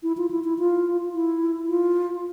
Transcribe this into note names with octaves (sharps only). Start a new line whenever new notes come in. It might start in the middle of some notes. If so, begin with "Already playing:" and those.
E4
F4
E4
E4
F4
E4
F4